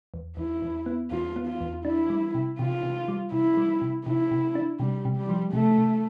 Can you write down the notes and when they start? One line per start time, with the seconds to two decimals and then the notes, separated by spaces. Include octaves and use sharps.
0.14 E2
0.37 E2 E4
0.62 E2
0.86 B3
1.11 E2 F4
1.36 B3
1.48 F4
1.61 E2
1.85 D4 E4
2.10 G3
2.34 C3
2.59 C3 F4
2.83 C3
3.08 G3
3.32 C3 E4
3.57 G3
3.82 C3
4.06 C3 E4
4.31 C3
4.55 D4
4.80 C3 G3
5.05 C3
5.17 G3
5.29 F3
5.53 C3 A3
5.78 C3